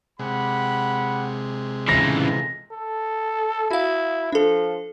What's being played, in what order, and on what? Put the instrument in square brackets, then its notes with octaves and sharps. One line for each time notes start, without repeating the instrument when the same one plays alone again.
[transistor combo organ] C3 G#3 [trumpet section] G4 F#5 B5
[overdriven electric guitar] C#3 E3 [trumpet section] A3 D#4 F4 [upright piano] A#6
[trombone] A4
[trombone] E4 [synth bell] F#4 F5
[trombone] F3 [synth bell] D4 A4